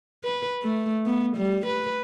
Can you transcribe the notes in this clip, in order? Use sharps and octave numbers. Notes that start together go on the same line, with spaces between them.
B4
A3
B3
G3
B4